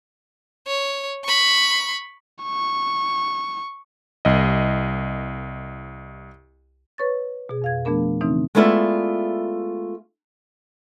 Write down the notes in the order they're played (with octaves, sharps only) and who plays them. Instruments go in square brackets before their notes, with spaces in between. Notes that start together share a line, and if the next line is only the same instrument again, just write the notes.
[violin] C#5
B5 C#6
[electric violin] C#6
[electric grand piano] C2 D#5
[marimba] B4 C#5 C#6 A6
B2 G#4
F2 F5 G#6
F3 A3 B3 D4 A#4
C#3 E3 A3 C4 D#4
[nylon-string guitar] G#3 A3 B3 E4 F4 D5